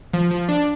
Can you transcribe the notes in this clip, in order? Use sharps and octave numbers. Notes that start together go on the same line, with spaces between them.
F3
F3
D4